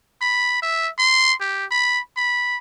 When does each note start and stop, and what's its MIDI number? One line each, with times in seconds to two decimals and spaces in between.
0.22 0.62 83
0.62 0.89 76
0.99 1.34 84
1.41 1.65 67
1.71 2.00 83
2.17 2.57 83